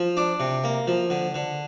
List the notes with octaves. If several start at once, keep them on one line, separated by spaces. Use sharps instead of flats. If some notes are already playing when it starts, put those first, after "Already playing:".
Already playing: F3
D4 D6
C3
A#3
F3
D3
D3